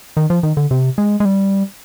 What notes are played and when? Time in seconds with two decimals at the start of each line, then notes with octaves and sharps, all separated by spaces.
0.17 D#3
0.30 F3
0.43 D#3
0.57 D3
0.71 C3
0.98 G#3
1.20 G#3
1.25 G3